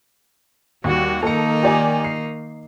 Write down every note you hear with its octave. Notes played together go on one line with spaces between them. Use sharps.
D#2 G3 F#4
D#3 A#3 D#4 A4 C#7
G4 D5 G#5
C7